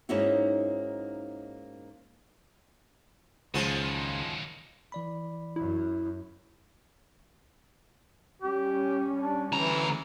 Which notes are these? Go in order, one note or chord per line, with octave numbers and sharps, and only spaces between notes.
G#2 A#3 C#4 D#4 E4 F#4
C#2 D#3 F3 F#3 G#3 B3
E3 D5 B5
F#2 E4
G3 C#4 G4
D4
D2 E3 A#5